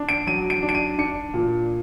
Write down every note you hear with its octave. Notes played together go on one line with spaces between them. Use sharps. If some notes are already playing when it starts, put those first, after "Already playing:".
Already playing: D4
D7
F#3 D#7
D7
D4
D7
D#7
D4 C#7
A#2